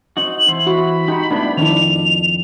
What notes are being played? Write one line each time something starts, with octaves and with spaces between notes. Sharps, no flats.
C4 D#4 F#4 F#7
E3 E4 C5
F#4 B5
D#4 F#4 G4
A3 B3 C4 D4 E4
F2 D#3 D4 E4 F7